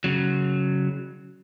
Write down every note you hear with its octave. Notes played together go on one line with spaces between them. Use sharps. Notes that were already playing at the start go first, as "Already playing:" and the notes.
C#3 F#3